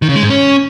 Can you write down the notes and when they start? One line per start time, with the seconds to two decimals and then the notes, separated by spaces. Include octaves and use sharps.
0.02 D#3
0.09 C#3
0.16 G#3
0.23 G#2
0.30 C#4